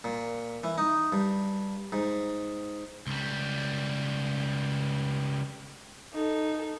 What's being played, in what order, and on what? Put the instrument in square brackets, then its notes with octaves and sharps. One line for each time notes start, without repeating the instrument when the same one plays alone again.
[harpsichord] A#2
E3
D#4
G2
G#2
[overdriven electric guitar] C#2 G3
[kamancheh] D#4 A4